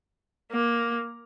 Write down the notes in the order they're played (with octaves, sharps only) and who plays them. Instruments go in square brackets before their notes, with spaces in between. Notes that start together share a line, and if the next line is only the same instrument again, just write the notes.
[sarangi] A#3